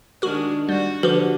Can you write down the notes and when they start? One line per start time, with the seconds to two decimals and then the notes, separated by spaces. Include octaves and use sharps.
0.22 D#3 G#3 D4 F#4 A#4
0.69 G3 F#4
1.03 D3 F3 F#4 G4 B4